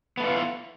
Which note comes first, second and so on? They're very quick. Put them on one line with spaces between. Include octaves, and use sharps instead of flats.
B3 A3 E3 F4